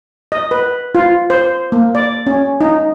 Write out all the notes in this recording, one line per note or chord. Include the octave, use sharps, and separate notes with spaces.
D#5
B4
F4
C5
A#3
D5
C#4
D#4